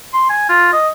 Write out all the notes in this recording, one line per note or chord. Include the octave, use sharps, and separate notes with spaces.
C6
G#5
F4
D#5